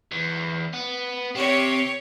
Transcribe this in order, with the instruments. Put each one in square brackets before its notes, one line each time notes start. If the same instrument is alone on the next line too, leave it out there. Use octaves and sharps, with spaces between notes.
[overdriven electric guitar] E2
B3
[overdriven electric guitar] C3 [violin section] G4 C#5